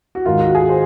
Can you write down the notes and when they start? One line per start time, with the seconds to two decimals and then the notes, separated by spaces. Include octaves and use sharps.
0.15 F#4
0.25 G#2 D#3 F4
0.41 F#4
0.55 G#4
0.69 C5